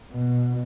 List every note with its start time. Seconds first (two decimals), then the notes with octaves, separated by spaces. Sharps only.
0.11 B2